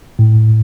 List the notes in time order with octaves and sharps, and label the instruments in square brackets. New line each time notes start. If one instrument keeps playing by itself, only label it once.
[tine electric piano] A2